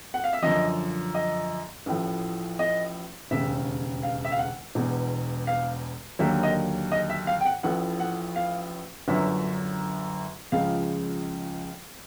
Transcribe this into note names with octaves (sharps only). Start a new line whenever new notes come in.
F#5
F5
E5
F#2 D3 F3 D#5
D#5
A1 A2 F3
D#5
E1 D#2 C#3 E5
F5
E5
F5
F#5
E1 E2 B2
F5
D#2 D3 F#3 A#3 E5
D#5
D#5
E5
F5
G5
F#5
A1 A2 F3 F#5
F#5
F5
G1 F#2 D3 F#3 E5
C#2 C#3 F3 G#3 F5